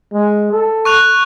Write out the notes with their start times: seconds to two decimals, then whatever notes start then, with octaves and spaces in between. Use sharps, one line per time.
0.13 G#3
0.52 A4
0.85 C#6 F#6 F7